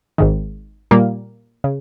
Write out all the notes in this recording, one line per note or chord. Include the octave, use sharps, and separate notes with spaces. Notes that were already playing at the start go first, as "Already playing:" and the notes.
G#1 G#2 D#3
A#2 G3 A#3
C#3